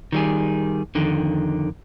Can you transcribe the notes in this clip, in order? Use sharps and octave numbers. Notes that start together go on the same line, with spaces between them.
D#3 G3 G#4
F2 D3 D#3